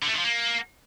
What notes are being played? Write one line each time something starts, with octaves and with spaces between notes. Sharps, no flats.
D3
A3
D#3
F3
A#3